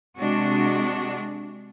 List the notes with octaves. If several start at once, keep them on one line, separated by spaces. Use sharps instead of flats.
C3 G#3 D4 F#4